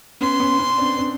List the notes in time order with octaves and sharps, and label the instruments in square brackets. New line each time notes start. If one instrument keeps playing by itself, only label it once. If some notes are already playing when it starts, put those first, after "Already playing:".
[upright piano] B3 C#4 [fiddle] C6
[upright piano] B3 C#4
B3 C#4
C4 D4
C4 D4